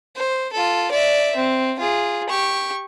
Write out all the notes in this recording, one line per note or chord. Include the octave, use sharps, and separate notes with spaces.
C5
F4 A4
D5 E5
C4
F4 G#4
G4 C#6